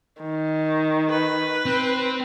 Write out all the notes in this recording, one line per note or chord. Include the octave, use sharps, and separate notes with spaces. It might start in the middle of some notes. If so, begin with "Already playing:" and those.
D#3
B4
C4